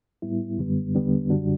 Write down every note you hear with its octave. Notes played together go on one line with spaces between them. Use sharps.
A2 G3 B3 E4
F#2 D3 G3 B3
E2 D3 G3 B3 D4
F#2 D3 G3 D4 F#4